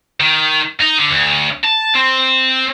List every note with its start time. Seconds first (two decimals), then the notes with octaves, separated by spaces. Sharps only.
0.20 D#3
0.81 D#4
0.98 D3
1.11 D2
1.64 A5
1.95 C4